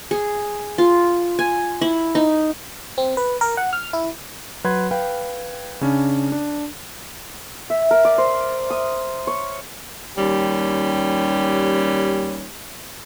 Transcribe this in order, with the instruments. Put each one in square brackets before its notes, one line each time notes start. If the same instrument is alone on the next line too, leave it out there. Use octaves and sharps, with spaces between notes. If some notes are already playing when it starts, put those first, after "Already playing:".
[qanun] G#4
F4
G#5
E4
D#4
[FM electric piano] C4
B4
A#4
F#5
F6
E4
[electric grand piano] F#3 B4 F#5 C6 G#6
B4 F5 G5
C#3 C#4 D4
D4
[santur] E5
A#4
D5
C5
D#6
C#5
[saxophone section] D#2 G3 C#4 G4